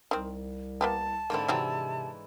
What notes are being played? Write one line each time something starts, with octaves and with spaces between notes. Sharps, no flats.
C2 D#3 C4
A#3 B3 G4 A5
G#2 D3 A#3 C4 E4
C3 E3 F#3 C4 D#4